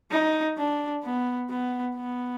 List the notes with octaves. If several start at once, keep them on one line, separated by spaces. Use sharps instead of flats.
D#4
D4
B3
B3
B3